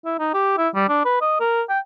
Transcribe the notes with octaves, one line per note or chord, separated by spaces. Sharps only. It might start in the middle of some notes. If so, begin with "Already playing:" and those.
E4
D#4
G4
E4
G3
D4
B4
D#5
A#4
G5